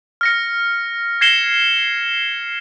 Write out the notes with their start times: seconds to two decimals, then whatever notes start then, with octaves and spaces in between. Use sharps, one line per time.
0.21 F6 A#6 C#7
1.21 G#6 A#6 C7 C#7 E7 G7